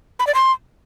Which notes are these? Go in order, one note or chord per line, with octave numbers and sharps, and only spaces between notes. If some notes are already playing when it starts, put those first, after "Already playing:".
B5
D5
C6